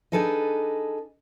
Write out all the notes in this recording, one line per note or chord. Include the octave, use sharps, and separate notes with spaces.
D4 D#4 G#4 A4 B4 D#5